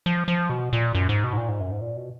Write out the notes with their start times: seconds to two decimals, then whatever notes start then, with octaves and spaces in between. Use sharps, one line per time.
0.06 F3
0.28 F3
0.50 B2
0.73 A#2
0.95 F#2
1.09 G#2
1.24 B2
1.33 G#2
1.37 A#2
1.48 G#2
1.60 F#2
1.72 G#2
1.81 A#2
1.97 B2